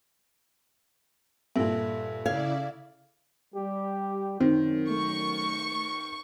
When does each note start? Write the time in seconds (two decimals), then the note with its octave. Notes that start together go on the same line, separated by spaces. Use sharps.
1.56 G2 A#2 A4 E5
2.26 C#3 E4 D5 F5 G#6
3.54 G3 G4
4.40 F#2 D#3 C4
4.90 A3 C#6